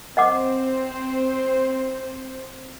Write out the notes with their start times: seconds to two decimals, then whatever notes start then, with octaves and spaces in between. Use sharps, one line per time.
0.17 C4 C5 D#5 F#5 D6